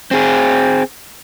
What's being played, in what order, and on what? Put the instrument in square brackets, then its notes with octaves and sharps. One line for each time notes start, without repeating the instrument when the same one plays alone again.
[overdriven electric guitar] C4 G#4